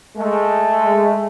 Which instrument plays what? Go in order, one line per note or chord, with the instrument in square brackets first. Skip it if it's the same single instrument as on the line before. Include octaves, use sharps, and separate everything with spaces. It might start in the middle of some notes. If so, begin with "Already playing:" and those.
[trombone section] G#3 A3